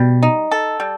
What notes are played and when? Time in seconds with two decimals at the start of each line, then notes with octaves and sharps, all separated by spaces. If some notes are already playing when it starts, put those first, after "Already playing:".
Already playing: B2 G3
0.23 D#4
0.51 A4
0.80 G3